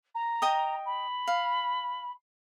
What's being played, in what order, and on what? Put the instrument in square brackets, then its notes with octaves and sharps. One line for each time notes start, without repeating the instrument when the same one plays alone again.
[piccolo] A#5
[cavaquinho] D#5 G5 D#6
[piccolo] B5
[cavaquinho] F5